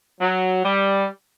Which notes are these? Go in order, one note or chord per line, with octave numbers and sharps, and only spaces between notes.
F#3
G3